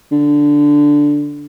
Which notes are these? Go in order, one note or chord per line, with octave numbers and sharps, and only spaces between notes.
D3